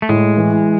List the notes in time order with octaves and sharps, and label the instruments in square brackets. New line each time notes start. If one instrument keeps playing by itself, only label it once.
[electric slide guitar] A3
[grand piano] A2 [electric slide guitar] G#3
[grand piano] E3